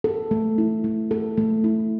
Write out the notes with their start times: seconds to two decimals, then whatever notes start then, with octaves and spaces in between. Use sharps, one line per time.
0.04 A4
0.31 A3
0.58 E4
0.84 A3
1.11 A4
1.38 A3
1.64 E4